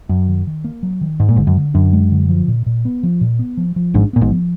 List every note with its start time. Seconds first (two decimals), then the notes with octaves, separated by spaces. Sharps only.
0.09 F#2 F#3
0.28 D#3
0.47 D#3
0.64 A#3
0.83 F#3
1.01 D#3
1.20 G#2 G#3
1.29 A#2
1.36 G#1 G#2 D3
1.47 F#2
1.57 D3
1.74 F#2 D4
1.93 G#3
2.11 D3
2.29 F3
2.48 A#2
2.66 A#2
2.85 B3
3.03 F3
3.21 A#2
3.39 B3
3.57 F3
3.76 F3
3.94 G#1 G#2 D4
4.13 A#2 B3
4.21 G#1 G#2
4.32 F3